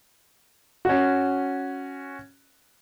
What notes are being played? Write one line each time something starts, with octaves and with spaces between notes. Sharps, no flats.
C#4 F#4